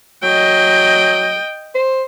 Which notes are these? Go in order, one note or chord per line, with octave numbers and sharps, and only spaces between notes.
F#3 D#5 G5
C5